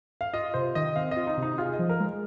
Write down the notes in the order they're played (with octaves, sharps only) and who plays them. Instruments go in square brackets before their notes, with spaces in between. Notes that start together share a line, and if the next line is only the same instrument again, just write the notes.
[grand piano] F5
[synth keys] F4 [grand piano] D#5
[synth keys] C3 [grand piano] C5
[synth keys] D#3 [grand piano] D#5
[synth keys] C4 [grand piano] F5
[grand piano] D#5
[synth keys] F4
[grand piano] D#4
[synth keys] C3
[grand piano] D#4
[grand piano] F4 [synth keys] G#4
[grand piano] D#5
[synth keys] F3
[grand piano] A#4
[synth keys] G#3